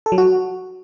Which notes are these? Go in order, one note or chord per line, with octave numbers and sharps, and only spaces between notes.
A4
F#3
F#4